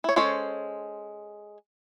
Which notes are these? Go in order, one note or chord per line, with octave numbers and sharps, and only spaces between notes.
E4 C#5
G#3 C#4 A4 C5 C#5